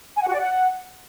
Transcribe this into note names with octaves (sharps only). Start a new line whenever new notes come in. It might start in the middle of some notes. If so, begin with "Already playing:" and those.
G#5
F#5
F#4
D5
F#5